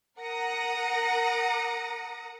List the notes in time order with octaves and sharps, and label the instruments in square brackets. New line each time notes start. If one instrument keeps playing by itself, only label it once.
[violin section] A#4 F#5 A#5 D#6 A#6 C#7